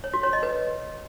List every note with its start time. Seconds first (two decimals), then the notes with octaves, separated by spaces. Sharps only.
0.04 C#5
0.14 F#4
0.23 C#5
0.33 D#5
0.43 B4